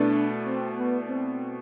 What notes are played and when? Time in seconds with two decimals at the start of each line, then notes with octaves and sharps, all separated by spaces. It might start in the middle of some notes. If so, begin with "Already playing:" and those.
Already playing: B2 A3 D4 E4 B4 D5
0.46 C4
0.77 B3
1.09 C4